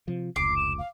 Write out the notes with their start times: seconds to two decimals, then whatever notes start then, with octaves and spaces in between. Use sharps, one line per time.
0.08 C3 F3
0.36 F1 C#2 D6 C7
0.57 E7
0.79 F5